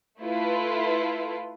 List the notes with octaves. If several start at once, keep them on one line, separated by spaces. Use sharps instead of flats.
A3 E4 F4 B4